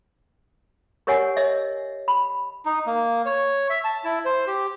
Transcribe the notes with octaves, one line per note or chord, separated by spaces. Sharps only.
G4 A#4 C#5 F#5 G#5
C#5 D#5 E5
B5
D#4
A#3
C#5
E5
A5
E4
C5
G4